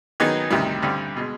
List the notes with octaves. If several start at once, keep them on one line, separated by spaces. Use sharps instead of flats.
D#3 F#3 B3 D#4 G#4
D2 C3 D#3 G3
G2 D3 G3 C4
B2 G#3